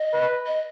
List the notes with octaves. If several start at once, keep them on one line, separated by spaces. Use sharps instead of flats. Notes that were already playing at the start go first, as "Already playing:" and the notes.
Already playing: D#5
B4
D#5